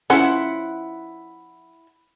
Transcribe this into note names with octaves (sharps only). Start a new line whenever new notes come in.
F3 C#4 E4 C5 F#5